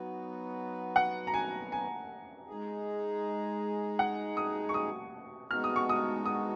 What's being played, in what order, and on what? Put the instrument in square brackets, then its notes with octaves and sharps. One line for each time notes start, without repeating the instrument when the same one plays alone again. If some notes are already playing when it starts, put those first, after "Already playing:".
Already playing: [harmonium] F#3 B3 D#4 F#4 B4
[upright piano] F#5
A#5
G#5
G#5
[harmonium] G#3 D#4 G#4
[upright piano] F#5
D#6
C#6
D#6
[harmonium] G#3 B3 D#4 F#4 [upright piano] F6
[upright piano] D#6
C#6
D#6
D#6